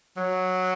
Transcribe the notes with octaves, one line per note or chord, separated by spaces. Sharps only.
F#3